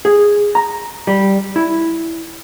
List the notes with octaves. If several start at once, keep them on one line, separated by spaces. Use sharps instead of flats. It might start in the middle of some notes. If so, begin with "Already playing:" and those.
G#4
A#5
G3
E4